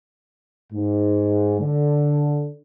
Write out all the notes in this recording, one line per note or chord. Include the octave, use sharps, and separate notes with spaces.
G#2
D3